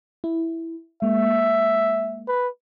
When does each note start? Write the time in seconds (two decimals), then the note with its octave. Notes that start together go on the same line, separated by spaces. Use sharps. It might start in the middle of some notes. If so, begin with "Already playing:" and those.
0.24 E4
1.02 G#3 A#3 E5
2.28 B4